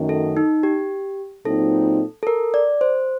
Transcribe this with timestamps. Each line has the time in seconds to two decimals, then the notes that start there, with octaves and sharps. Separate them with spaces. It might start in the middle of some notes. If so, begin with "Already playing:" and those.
Already playing: F#2 D#3 A3
0.09 A4
0.37 D#4
0.63 G4
1.45 A#2 F#3 C4 D#4 A4
2.23 A4
2.27 A#4
2.54 D5
2.81 C5